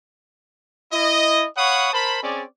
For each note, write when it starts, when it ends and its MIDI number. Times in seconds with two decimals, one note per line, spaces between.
0.92 1.45 64
0.92 1.45 75
1.57 1.93 73
1.57 1.93 77
1.57 1.93 78
1.57 1.93 83
1.57 1.93 85
1.57 1.93 87
1.93 2.22 70
1.93 2.22 72
1.93 2.22 81
1.93 2.22 83
2.22 2.44 60
2.22 2.44 61
2.22 2.44 68
2.22 2.44 74